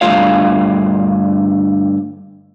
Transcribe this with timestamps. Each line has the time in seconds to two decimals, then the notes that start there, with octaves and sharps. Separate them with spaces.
0.01 G2 D3 A3 F4 C#5 F5